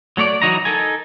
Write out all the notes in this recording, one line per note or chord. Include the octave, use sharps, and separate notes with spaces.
F#3 A3 C#5 D5
E3 F#3 D#4 F#4 A#5
D#4 A4 A#4 G#5